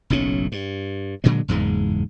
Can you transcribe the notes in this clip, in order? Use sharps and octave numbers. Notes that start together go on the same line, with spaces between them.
F#1 B1 A2 C#4
G2
A#2 D3 F#3 G#3
F#1 E2 G#2 G#3